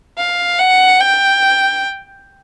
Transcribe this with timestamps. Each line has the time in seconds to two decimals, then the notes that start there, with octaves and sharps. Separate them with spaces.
0.18 F5
0.59 F#5
1.00 G5